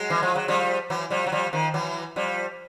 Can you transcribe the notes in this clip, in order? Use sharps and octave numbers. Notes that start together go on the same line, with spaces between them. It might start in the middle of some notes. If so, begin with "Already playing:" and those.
Already playing: F#3 G#3
E3
F3
F#3
F3 G3
E3 F#3
F3 G3
F#3
F3 G3
D#3 F3
E3 F#3
F3 G3